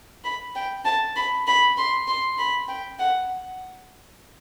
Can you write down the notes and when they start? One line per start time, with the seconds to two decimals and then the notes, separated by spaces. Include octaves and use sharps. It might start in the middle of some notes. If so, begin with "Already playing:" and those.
0.24 B5
0.55 G5
0.85 A5
1.16 B5
1.47 B5
1.77 C6
2.07 C6
2.38 B5
2.68 G5
2.99 F#5